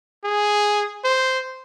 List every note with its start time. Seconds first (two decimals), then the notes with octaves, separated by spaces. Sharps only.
0.24 G#4
1.04 C5